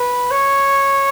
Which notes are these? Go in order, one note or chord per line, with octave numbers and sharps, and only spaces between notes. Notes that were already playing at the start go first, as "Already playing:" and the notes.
Already playing: B4
C#5